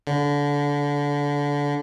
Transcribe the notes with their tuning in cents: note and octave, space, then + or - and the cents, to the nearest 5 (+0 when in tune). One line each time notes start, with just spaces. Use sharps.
D3 -25